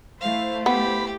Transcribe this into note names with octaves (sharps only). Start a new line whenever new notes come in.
A3 E4 C5 F5
B3 G4 B5